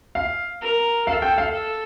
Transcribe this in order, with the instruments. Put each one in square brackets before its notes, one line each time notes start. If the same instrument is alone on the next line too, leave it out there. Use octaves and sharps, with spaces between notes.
[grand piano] F5
[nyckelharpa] A#4
[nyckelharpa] A4 [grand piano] F5
[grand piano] G5
F5
[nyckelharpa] A4